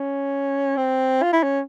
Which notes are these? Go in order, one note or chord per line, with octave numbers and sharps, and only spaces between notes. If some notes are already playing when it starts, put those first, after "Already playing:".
Already playing: C#4
C4
F4
E4
C#4